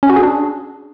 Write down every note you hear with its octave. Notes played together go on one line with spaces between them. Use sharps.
C#4
F#4
G#4
D4